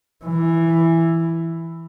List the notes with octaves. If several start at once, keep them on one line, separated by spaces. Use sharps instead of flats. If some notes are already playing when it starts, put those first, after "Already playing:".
E3